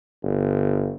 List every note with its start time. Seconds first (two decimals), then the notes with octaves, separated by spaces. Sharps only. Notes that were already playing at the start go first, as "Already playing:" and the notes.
0.23 G1